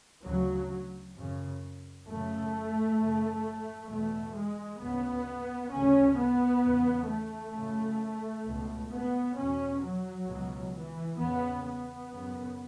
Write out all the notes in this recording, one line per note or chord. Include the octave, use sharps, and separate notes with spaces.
D2 C#3 F#3
F#2 C#3
F#2 C#3 A3
F#2 C#3
E2 B2 A3
G#3
D2 C#3 B3
D2 C#3 C#4
B3
E2 C#3
A3
F#2 C#3
C#2 B2
B3
E2 B2 C#4
F#3
C#2 B2
E3
E2 C#3 B3
B3
F#2 C#3